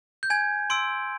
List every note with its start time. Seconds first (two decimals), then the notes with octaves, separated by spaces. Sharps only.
0.23 G6
0.30 G#5 G#6
0.70 C6 E6 D7